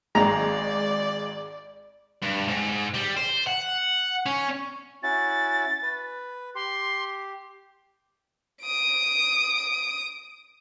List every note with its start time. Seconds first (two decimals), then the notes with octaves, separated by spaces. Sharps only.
0.15 G#1 G#3 D5 A#5
2.23 G2
2.48 G#2
2.94 G3
3.17 C5
3.47 F#5
4.26 C#4
5.03 C#4 E4 F#4 A6
5.83 B4
6.55 G4 C6
8.62 D#6 D7